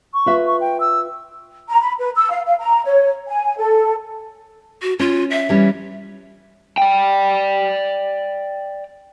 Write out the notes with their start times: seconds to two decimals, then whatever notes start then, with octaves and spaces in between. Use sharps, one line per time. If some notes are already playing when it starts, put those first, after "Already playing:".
0.14 C#6
0.26 F4 B4 E5
0.47 C#6
0.60 G5
0.80 E6
1.69 A#5
1.81 B5
1.99 B4
2.15 E6
2.30 F5
2.46 F5
2.59 A#5
2.85 C#5
3.28 G#5
3.58 A4
4.82 F#4
4.99 C#4 F4
5.31 E5
5.49 E3 G3 C#4
6.78 D5 G5